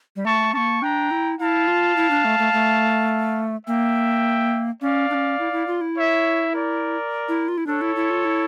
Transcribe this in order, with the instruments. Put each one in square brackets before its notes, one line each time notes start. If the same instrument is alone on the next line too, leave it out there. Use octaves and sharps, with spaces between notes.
[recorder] G3
[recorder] A3 [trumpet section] A5 C#6
[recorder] A#3 C#4 [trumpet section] A5 C#6
[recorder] D4 [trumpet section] G5 A#5
[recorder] E4
[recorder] E4 [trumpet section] F5 A5
[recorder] F4
E4
D4
A3
A3
A3
[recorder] A#3 [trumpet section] E5 G5
[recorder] C#4 [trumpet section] D5 F5
[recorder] D4
C#4
E4
E4
F4
E4
[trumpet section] C#5 E5
A#4 D5
[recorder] E4
F4
E4
[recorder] D4 [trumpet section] A4 C#5
[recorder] E4
E4
F4
E4